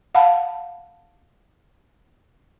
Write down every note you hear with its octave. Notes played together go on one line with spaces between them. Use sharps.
F5 F#5 A5 B5